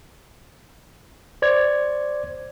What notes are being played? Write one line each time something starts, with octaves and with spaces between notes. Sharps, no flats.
C5 D5 G#6